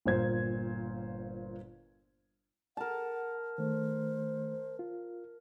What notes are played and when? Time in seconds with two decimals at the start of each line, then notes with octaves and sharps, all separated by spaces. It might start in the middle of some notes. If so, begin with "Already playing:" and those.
0.06 G1 A#2 C5 G#6
2.77 A#4 F#5 A5
3.58 D#3 A3 C5
4.79 F4